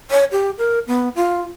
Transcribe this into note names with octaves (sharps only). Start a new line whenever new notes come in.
C#5
G4
A#4
B3
F4